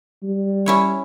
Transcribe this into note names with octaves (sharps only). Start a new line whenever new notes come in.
G3
C#4 E4 C#5